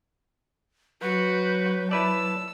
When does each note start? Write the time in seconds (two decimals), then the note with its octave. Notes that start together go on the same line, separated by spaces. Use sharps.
1.02 F#3 F#4 B4 G6
1.91 E4 B4 D5 A5 E6